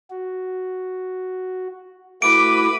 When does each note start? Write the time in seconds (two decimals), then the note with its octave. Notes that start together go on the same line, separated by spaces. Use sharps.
0.10 F#4
2.22 A3 E4 F#4 B4 D6 D7